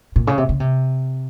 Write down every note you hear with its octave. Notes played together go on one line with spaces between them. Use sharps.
A#2
C#3
C3
C#3
C3